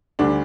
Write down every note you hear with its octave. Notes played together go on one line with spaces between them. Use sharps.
D2 D3 G3 D4